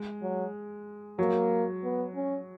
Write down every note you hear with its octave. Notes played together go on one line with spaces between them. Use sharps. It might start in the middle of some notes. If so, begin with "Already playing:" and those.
Already playing: G#3
F#3
F#3 A#3
B3
C#4